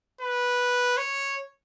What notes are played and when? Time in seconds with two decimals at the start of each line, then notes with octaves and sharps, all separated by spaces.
0.21 B4
0.97 C#5